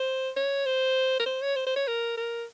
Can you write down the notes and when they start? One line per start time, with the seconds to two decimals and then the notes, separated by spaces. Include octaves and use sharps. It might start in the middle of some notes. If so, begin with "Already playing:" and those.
Already playing: C5
0.37 C#5
0.66 C5
1.20 A#4
1.26 C5
1.42 C#5
1.56 C5
1.67 C5
1.76 C#5
1.87 A#4
2.18 A#4